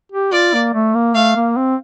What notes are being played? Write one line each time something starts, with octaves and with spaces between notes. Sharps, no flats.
G4
F4 D5
A#3
A3
A#3
A3 F5
A#3
C4